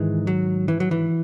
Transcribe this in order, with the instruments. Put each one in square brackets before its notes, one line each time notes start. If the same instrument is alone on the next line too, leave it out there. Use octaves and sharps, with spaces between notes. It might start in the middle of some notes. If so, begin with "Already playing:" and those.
Already playing: [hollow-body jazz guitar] G#2 D#3 E3 G#3
F#3
E3
F#3
E3